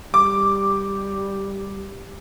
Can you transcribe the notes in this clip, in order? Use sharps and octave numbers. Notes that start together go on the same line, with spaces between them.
G3 D6